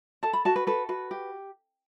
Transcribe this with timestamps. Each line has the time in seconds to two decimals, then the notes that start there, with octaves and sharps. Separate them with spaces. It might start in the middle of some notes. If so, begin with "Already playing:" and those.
0.23 A4 A5
0.33 B5
0.45 F#4 A5
0.56 B4
0.67 A4 B4
0.89 F#4 B4
1.11 G4